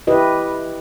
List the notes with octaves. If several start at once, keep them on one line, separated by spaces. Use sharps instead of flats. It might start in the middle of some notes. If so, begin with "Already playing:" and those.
E4 G4 B4 D#5